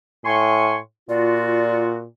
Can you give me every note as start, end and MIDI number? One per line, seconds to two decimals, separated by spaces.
0.25 0.79 45
0.25 0.77 80
0.25 0.77 84
0.25 0.77 85
1.09 2.05 46
1.09 2.00 65
1.09 2.00 66
1.09 1.84 74